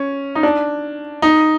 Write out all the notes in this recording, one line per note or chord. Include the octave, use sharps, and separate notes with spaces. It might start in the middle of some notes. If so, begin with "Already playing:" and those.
Already playing: C#4
D#4
D4
D#4